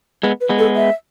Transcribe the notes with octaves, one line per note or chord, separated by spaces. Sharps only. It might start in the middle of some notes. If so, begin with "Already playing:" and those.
G#3 B3
B4
G#3 B3
A4
E5